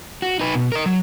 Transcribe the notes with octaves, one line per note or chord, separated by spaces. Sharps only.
F#4
D#4 B4
B2
A#4 D#5
F#3